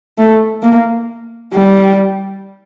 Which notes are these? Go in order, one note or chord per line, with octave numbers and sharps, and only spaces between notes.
A3
A#3
G3